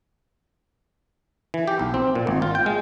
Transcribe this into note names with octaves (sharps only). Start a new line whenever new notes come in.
E3
G4
B1
C4
A#2
G#1
F4
G5
G#3